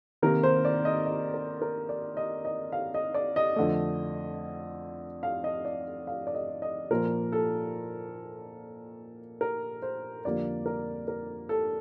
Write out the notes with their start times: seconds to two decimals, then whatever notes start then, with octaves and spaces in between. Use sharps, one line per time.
0.22 C3 D#3 A#3 A#4
0.43 C5
0.65 D5
0.85 D#5
1.06 D#5
1.34 A#4
1.61 A#4
1.89 D5
2.17 D#5
2.45 D#5
2.72 F5
2.94 D#5
3.14 D5
3.36 D#5
3.56 F2 D3 A3
5.23 F5
5.44 D#5
5.65 D5
6.07 F5
6.27 D5
6.35 D#5
6.62 D#5
6.91 A#2 F3 A#3 A#4
7.32 A4
9.41 A#4
9.82 C5
10.25 F2 D3 G3 A#3 D5
10.66 A#4
11.08 A#4
11.49 A4